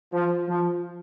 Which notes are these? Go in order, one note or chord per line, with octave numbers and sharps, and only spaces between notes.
F3
F3